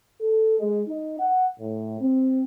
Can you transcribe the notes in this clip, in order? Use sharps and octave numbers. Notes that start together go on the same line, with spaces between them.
A4
G#3
D#4
F#5
A2
C4